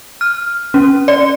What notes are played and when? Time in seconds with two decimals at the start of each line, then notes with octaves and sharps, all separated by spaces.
0.21 F6
0.74 C#4
1.08 D5